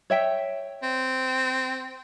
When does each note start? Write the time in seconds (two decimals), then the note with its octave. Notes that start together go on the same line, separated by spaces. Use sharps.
0.10 C#5 E5 G5
0.83 C4